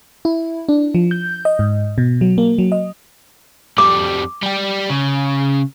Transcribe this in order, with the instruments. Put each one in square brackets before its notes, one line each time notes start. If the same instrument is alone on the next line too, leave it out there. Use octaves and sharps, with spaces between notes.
[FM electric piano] E4
D4
F3
G6
D#5
G#2
B2
F#3
A#3
F#3
D#5
[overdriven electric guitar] F2 G3 [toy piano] D6
[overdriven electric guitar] G3 G4
C#3